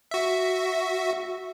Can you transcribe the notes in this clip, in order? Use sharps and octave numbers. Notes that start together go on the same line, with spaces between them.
F#4 E5